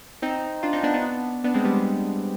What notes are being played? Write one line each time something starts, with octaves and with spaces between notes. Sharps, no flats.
C4 D#4
D4 F4
C4 D#4
B3 D4
B3 D4
B3 D4
G#3 C4
G3 B3